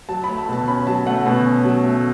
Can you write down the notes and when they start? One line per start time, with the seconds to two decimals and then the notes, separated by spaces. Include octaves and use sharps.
0.09 F#3 A5
0.24 A3 B5
0.38 A5
0.49 B2 A5
0.68 C#4 B5
0.87 F#3 A5
1.06 A3 F#5
1.26 B2 A5
1.45 C#4
1.65 F#3
1.84 A3